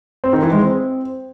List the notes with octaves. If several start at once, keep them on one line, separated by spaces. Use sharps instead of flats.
C4
D#3
E3
G#3
C4